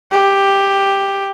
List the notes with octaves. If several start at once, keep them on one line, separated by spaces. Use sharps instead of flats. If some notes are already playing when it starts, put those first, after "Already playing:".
G4